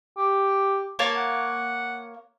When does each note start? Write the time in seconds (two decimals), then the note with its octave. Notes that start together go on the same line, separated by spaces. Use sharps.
0.18 G4
0.99 A#3 C#5 A5
1.17 F#5